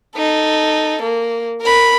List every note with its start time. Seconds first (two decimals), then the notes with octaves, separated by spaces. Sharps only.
0.16 D#4 A4
1.02 A#3
1.61 A#4 B5